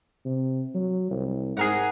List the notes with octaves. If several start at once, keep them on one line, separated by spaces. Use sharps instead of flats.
C3
F#3
C2
G#2 G#4 A#4 F#5